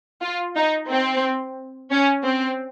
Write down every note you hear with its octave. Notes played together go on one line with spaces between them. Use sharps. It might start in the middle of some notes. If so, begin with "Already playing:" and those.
F4
D#4
C4
C#4
C4